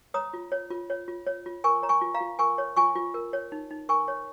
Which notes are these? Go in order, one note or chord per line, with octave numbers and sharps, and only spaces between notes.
C#5 A#5 D#6
F4
C#5
F4
C#5
F4
C#5
F4
A#4 G#5 C#6
C#5 A#5
G#5 C#6
F4
F5 A#5
F4
A#4 G#5 C#6
C#5
F4 G#5 C#6
F4
A#4
C#5
D#4
D#4
A#4 G#5 C#6
C#5